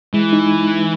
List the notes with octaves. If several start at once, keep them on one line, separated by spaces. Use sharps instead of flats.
E3 G#3
D#4